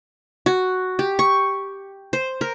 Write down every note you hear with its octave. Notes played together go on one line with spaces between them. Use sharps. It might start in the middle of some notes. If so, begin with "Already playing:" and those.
F#4
G4
C#6
C5
A#4